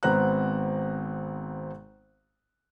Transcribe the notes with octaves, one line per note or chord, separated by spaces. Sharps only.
G#1 B3 C4 A#5 F#6